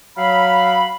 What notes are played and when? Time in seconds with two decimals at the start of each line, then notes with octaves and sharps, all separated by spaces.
0.17 F#3 F5 B5